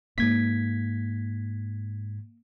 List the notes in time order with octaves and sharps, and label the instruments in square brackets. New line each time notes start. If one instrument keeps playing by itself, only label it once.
[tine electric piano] G#2 G#6 B6 [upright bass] A#3